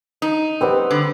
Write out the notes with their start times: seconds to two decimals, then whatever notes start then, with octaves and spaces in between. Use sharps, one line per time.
0.22 D#4
0.61 G3 B3 C4 B4
0.91 D3